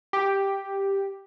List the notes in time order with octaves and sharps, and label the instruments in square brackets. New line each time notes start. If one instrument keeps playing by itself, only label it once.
[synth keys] G4